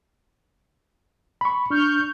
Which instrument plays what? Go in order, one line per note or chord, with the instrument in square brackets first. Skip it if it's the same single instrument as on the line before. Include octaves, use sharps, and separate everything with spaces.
[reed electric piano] B5 C#6
[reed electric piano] D4 [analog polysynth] C#6 F6 G6